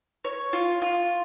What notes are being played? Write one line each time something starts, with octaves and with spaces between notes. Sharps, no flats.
C#5
F4
F4